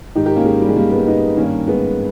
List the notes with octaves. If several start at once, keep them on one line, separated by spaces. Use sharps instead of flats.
G#2 D#3 D#4 G4
G4 A#4
A#3 C#4
G#3
G3
G#3
G3 A#3
G#3 B3
B3 D#4
G2 D#3 A#3 C#4
G#3 B3